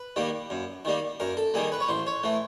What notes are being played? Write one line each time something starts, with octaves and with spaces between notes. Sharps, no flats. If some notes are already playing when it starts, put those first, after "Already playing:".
Already playing: B4
D#3 G3 A#3
F#2
D#3 G3 A#3
F#2 A#4
A4
D#3 G3 A#3 G#4
B4
C#5
A1 C5
C#5
E3 A3